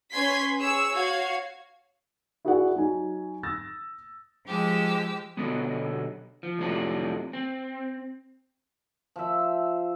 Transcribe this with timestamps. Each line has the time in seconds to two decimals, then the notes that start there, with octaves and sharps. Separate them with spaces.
0.12 C#4 B4 C6 G#6 B6
0.57 G#4 C#5 E6
0.93 F#4 C#5 F5 G#6
2.45 E4 F#4 G#4 A#4 D5 F#5
2.76 F#3 D#4 G#5
3.43 D#6 E6 A6 A#6
4.46 F3 G#3 G4 E6
5.37 B2 D3 F#3 G3 B3
6.43 F3
6.59 F2 A2 C3 F#3 D4 F4
7.33 C4
9.16 F3 E5